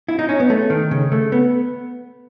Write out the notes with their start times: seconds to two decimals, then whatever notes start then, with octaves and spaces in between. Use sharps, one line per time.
0.08 E4
0.19 D#4
0.29 C#4
0.40 B3
0.50 A3
0.70 D#3
0.91 C#3
1.12 A3
1.32 B3